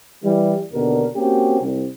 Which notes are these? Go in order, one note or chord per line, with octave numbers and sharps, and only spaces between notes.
E3 G3
D#2 B2 D3 D4 A#4
A#3 C4 C#4 F#4 G4
C2